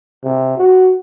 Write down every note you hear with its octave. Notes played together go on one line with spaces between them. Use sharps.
C3
F#4